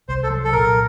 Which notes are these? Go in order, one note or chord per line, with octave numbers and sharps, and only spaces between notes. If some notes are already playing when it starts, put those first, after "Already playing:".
C2 C5
A4
F#3
A4
A#2 A#4